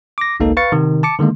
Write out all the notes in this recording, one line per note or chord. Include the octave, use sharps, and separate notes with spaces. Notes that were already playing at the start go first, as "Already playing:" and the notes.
D6 A#6
G#1 C#2 A#3 D#4 A4
B4 F5 C#6 A6 C#7
C3 D#3
A5 D6 C#7
D3 D#3 G#3 A#3